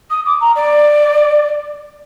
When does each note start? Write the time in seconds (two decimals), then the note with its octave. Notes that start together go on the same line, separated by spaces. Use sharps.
0.10 D#6
0.26 D6
0.41 A#5
0.55 D5